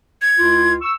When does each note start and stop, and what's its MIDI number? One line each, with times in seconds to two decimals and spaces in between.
0.22 0.73 92
0.38 0.75 37
0.38 0.75 64
0.38 0.75 65
0.81 0.92 85
0.81 0.92 88